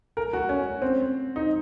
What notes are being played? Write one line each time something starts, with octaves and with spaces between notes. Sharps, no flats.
A#4
F#4
C#4
C4
D#4